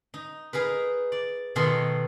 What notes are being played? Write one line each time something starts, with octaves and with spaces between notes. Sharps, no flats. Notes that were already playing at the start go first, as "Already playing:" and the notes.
D#4
D#4 G#4 A#4 B4
D5
B2 D#3 A4 D#5 G#5 C6